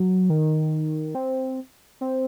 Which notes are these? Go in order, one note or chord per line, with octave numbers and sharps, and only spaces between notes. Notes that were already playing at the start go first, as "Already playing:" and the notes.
Already playing: F#3
D#3
C4
C4